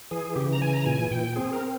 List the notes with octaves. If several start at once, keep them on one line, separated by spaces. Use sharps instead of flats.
E3 G#4
C#3 G4
A#5
E3 G#5
A#5
A#2 G#5
A#2 G5
C4 G#4
A#4
C4